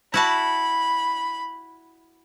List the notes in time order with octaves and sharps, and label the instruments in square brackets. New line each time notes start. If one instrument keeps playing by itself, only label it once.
[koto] E4 F#4 A5 [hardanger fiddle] B5